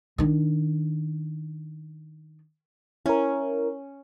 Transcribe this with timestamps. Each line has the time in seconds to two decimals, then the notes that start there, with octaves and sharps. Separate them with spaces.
0.18 D#3 D4
3.06 C#4 E4 A#4